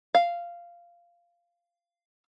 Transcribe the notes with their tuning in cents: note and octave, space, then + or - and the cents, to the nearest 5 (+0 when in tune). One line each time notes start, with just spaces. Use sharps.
F5 -10